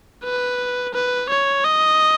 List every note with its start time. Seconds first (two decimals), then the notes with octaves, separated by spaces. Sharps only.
0.24 B4
0.94 B4
1.30 C#5
1.64 D#5